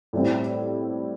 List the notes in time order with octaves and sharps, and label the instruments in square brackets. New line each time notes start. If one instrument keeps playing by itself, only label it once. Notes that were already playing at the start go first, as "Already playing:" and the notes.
[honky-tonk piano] A2 G3 C4